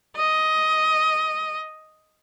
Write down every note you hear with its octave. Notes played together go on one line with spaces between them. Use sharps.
D#5